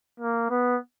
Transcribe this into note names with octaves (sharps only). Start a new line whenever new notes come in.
A#3
B3